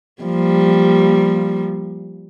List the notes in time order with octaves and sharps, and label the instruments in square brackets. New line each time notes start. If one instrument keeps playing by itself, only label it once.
[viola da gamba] F3 G3 A#3